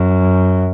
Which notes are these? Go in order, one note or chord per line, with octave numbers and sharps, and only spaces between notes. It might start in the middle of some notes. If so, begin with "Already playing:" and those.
Already playing: F#2